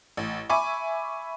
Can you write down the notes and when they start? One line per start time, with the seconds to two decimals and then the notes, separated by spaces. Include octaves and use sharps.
0.17 A1
0.49 E5 G#5 B5 C#6 D6